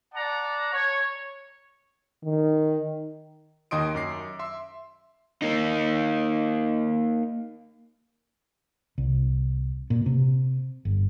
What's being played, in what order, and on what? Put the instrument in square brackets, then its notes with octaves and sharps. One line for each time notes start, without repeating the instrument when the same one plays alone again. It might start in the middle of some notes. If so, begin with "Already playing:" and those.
[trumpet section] D5 F#5 A5 A#5
C#5
[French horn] D#3
[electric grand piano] D#2 D#3 D#5 C6 D#6 D7
F#2 D6 C7
E5 C6
[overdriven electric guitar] A#3 D#4
[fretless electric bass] C2
A#2
C3
G1